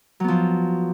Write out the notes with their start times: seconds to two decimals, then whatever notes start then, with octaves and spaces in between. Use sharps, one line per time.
0.20 F#3
0.24 B3
0.28 F3